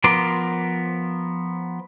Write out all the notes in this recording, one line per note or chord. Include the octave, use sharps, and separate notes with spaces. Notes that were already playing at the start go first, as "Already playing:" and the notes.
F3 B3 A#4 C6 D6